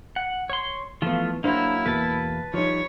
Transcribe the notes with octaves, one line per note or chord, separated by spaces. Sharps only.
F#5
C#5 C6
E3 F3 A3 B3 F4
F#3 A#3 D4 E4 C5
E2 B2 A#3 B4 A5
F3 G3 D#4 C#5